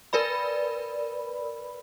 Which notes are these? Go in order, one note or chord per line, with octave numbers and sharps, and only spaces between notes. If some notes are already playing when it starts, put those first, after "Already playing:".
A#4 B4 D5 B5